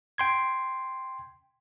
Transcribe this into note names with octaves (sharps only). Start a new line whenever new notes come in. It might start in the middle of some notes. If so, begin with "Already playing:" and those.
G5 C6 G#6